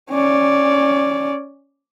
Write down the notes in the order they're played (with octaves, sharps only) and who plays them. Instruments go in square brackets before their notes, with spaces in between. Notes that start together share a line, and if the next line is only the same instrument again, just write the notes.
[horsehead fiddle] C#4 D5